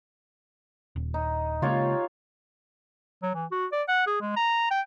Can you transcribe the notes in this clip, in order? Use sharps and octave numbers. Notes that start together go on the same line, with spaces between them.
D#1
D#4
C#3 G#3 A#3 F4 G4 C#5
F#3
E3
F#4
D5
F#5
G#4
G#3
A#5
G5